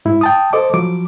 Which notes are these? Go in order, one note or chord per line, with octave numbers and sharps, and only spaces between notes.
G#2 E4
G5 A5 D#6
A4 C5 D#5 D6
F3 F#3 D6